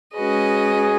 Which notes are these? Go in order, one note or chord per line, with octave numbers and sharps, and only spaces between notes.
G#3 C#4 F#4 G#4 B4 D#5